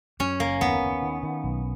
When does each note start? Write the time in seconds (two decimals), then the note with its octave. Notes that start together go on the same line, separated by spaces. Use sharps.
0.20 F#2 C#4
0.40 F#1 A#3
0.61 D#2 B3
0.82 D#2
1.03 D#3
1.23 D#3
1.44 B1